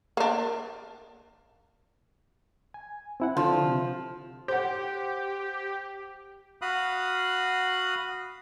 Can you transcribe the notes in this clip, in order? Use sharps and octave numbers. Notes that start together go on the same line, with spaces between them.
A#3 D4
G#5
C4 E4 F#5
D3 F3
C3
G4 C5 F#5
F#4 F5 B5 D#6 F#6